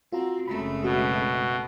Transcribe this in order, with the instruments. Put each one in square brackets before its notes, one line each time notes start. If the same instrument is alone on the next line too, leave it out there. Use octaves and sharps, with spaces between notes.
[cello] C4 [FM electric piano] F4 F#4 A#5
[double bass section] F#1 C#3 G#3 [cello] A3 C4 [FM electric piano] B5
[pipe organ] B2 [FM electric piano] F#4